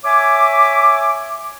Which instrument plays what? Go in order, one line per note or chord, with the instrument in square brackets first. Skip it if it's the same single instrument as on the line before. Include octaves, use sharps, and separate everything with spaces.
[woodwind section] C#5 E5 G#5 D6